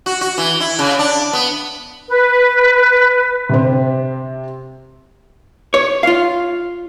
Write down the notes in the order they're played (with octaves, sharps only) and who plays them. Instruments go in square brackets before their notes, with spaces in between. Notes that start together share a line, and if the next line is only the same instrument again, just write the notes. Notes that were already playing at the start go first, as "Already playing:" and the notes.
[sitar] F#4
F#4
E3
E4
C#3
D4
B3
[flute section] B4
[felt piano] C3 C4
[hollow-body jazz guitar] C#5
F4 F5